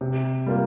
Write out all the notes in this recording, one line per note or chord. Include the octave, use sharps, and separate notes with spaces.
C3
G3 A#3 F4